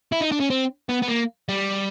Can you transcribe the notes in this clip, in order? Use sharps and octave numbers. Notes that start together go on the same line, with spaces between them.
E4
D#4
D4
C#4
C4
B3
B3
A#3
G3